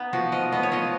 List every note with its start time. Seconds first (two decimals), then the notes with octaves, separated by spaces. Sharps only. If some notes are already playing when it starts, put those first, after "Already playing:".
Already playing: B3 D#4
0.13 F3 F#4
0.32 F3 D#5
0.52 B3 D#5
0.63 C#5
0.72 F3 D#5